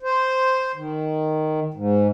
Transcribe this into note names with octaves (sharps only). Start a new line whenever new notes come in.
C5
D#3
G#2